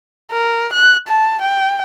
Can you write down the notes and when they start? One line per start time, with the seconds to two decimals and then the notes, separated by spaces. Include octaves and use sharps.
0.32 A#4
0.73 F#6
1.08 A5
1.42 G5